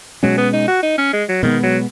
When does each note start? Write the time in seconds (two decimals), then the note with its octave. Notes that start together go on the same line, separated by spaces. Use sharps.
0.23 B2 F#3 G#3 C#4
0.38 B3
0.53 D#4
0.68 F#4
0.83 D#4
0.98 C#4
1.13 G#3
1.29 F#3
1.43 B2 D#3 G#3 B3
1.63 F#3